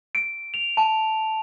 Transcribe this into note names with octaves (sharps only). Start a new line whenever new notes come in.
D7
F7
A5